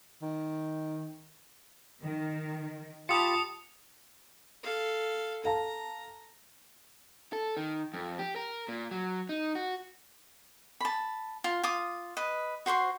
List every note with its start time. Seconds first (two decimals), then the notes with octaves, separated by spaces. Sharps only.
0.22 D#3
2.01 D#3
3.09 F4 G4 A5 B5 D#6 C#7
4.63 A4 F5
5.44 A4 F5 A5 A#5
7.33 A4
7.57 D#3
7.94 F2
8.19 G4
8.36 A#4
8.68 A#2
8.91 F#3
9.29 D#4
9.55 F#4
10.81 A5 B5
11.44 F4
11.63 F4 D6 D#6
12.17 B4 D#5
12.66 F#4 C5 C6 C#6